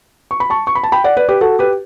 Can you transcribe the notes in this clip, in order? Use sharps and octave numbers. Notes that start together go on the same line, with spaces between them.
C#6
B5
A5 C#6
C#6
B5
A5
G5 B5
D5 F#5
B4 D5
G4 B4
F#4 A4
G4 B4